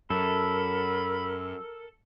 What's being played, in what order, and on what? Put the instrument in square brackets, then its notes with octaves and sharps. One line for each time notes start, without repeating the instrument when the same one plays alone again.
[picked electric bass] F#2 [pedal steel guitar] A4 [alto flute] A#4 [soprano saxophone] B5